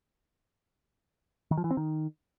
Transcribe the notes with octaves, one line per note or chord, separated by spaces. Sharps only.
D#3
F3
E3
C4
D#3